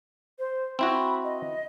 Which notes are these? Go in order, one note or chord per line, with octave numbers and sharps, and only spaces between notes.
C5
C4 E4 F#4 B5
D#5